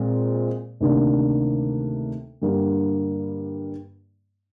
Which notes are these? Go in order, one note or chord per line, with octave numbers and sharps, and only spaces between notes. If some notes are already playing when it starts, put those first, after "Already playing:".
Already playing: A#2 G#3 C4
D2 C3 D#3 A#3 D4
G2 D3 G3 A#3